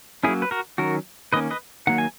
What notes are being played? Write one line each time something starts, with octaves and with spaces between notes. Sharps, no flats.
F#3 A#3 C#4 E4 G#4
B4
F#4 A#4
D#3 F#3 C#4 F#4 A#4
D#3 A#3 C#4 B4 D#5
B4 D#5
D#3 F#3 A#3 F#5
G#5